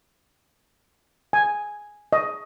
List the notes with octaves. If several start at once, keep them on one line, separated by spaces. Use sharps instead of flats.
G#5
D#5